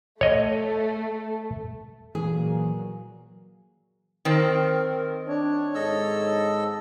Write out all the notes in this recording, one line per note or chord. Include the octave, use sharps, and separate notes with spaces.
A3 C#5 D#5
A#2 E3 F#3 A#3 G#4
D#3 C4 A#4
D4 C#5
G#2 A4 D#5 E6